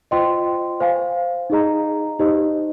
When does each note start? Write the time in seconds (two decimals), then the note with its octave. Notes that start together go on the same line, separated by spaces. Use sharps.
0.11 F4 C5 D#5 G5 C6
0.80 C5 F5 G#5
1.50 D#4 G#4 D#5 A#5
2.19 D#4 G4 C5 D#5